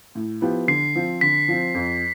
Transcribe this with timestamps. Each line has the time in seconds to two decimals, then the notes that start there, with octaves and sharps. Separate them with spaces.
0.15 A2
0.41 F3 B3 E4 G4
0.67 D3 C7
0.95 F3 C4
1.21 D3 B6
1.48 F3 C4
1.74 F2